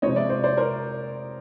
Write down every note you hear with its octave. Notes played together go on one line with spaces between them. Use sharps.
C3 F3 G#3 C4 C#5 D#5
D5 E5
C5 D5
C5 D5
A#4 C5